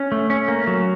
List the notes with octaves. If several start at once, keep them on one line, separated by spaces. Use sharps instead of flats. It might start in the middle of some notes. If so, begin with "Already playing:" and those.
Already playing: C#4
A3
C#4
A#3
F#3